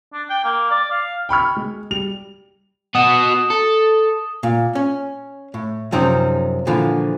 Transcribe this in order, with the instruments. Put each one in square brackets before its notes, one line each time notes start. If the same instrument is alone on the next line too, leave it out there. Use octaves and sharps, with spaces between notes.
[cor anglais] D4
G5
A#3
D5
F5
[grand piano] G5 B5 C#6 F6
G#3
G3 F7
[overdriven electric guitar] B3 F#4 [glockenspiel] D#6 E7
[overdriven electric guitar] A4
[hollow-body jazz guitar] A#2
C#4
A2
F#2 C3 F3 C4 C#4 D#4
A#2 D3 E3 F3